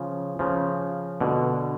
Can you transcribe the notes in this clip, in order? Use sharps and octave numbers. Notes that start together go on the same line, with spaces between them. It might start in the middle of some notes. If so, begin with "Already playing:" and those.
Already playing: C#3 F3
C#3 F3
B2 D3